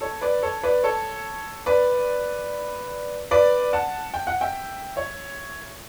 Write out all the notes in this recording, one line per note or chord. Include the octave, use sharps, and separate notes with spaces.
A4 C#5
B4 D5
A4 C#5
B4 D5
A4 C#5
B4 D5
B4 D5
F#5 A5
G5
F#5
E5 G5
C#5 E5